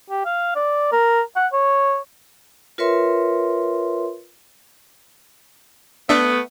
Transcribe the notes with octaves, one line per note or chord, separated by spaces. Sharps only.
G4
F5
D5
A#4
F#5
C#5
F4 A#4 B4 C#5 E5 C6
A3 B3 D4 E5